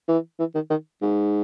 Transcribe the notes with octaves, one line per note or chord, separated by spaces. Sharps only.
E3
E3
D#3
D#3
G#2